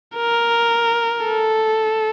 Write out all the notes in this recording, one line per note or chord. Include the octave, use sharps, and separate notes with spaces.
A#4
A4